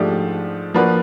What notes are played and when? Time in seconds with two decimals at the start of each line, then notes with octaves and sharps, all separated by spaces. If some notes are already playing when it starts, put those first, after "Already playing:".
Already playing: G#2 F3 A3 D4 G4
0.74 F3 A#3 D4 F#4 B4